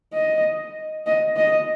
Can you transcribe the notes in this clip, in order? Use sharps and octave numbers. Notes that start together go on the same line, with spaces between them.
D#5
D#5
D#5